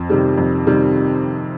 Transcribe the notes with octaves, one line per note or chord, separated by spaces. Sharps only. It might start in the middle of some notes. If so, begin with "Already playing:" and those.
Already playing: F2
C3 D#3 G3
F2
C3 D#3 G3